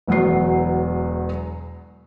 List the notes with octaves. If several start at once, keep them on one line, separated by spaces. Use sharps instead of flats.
E1 E2 F#3 B3 C7